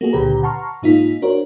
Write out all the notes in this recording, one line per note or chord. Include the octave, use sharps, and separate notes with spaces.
A#3 F#4 G#4
C#2 A#2 D3 G4 B4 A#5
F#5 A5 A#5 C6 C#6 F6
G#2 A#3 D#4 F4 B6
D4 F#4 A#4 C5 C#5